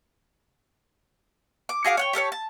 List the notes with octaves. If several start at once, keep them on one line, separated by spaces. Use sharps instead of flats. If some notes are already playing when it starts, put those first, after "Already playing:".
D6
F#4 G#4 F5 D6
C#5 F#5 G5
G4 A4 A#4 C#5
A5